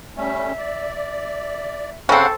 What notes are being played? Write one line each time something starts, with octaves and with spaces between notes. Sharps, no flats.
G3 A3 C#4 E5
D5
E5
C#3 C4 A4 F5 F#5 F#6